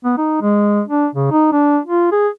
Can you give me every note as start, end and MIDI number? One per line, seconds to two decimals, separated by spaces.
0.05 0.15 59
0.18 0.38 63
0.42 0.82 56
0.88 1.07 62
1.15 1.28 49
1.31 1.49 63
1.52 1.79 62
1.85 2.11 65
2.12 2.28 68